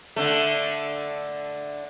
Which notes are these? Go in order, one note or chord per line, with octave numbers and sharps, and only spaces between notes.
D3 A3